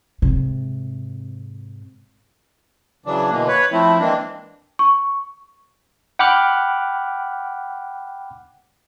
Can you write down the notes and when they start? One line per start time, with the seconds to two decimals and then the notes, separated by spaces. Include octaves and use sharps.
0.22 G#2 C3
3.06 C#3 E3 F#3 D4
3.30 B2 D3 E3 A#3
3.48 B4 C#5
3.72 F3 A3 C4 E4
4.00 E3 G#3 A#3 C4 D4
4.79 C#6
6.19 F#5 G5 B5 D6 F6 F#6